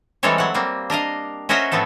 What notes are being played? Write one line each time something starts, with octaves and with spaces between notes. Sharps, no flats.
E3 G3 G#3 C4 A4 C#5
F#3 F#5
G3 A#3 C4
D4 A#4 D#5 F5
C#4 F#4 A#4 C5 D#5 E5
A2 F3 B3 C4 A4